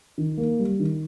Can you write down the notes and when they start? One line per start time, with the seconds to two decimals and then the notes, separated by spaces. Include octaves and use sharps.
0.18 D#3
0.37 A#3
0.59 G3
0.80 D#3